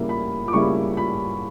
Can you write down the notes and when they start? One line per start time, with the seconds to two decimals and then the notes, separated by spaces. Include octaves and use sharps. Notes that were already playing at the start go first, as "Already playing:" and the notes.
Already playing: C#3 G3 A#3 E4
0.09 B5
0.48 D6
0.53 C#3 G3 A#3 E4 C#6
0.97 B5